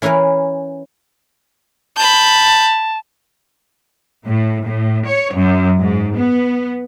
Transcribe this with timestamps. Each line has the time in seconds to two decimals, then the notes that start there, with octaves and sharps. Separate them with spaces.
0.02 E3 C#4 E4 A#4 B4
1.97 A5 B5 G6
4.25 A2
4.65 A2
5.06 C#5
5.34 F#2
5.80 G#2
6.16 B3